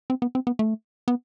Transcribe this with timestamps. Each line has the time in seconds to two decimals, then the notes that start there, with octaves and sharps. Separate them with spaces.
0.10 C4
0.22 B3
0.35 C4
0.47 B3
0.59 A3
1.08 B3